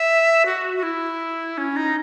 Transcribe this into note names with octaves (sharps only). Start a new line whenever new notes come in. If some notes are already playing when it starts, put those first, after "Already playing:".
Already playing: E5
F#4
F#4
E4
C#4
D#4